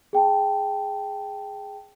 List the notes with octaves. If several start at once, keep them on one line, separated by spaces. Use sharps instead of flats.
G#4 G5 A5